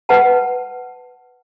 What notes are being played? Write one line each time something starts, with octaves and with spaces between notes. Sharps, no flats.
B4 F#5 A5